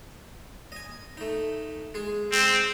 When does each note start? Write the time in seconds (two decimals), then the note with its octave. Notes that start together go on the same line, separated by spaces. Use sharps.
0.72 D#5 G#5
1.17 A3 D#4
1.94 G#3 G#4
2.32 G#3 C4